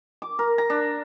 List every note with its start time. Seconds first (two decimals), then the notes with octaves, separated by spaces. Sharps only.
0.22 D6
0.39 A#4
0.58 A#5
0.70 D4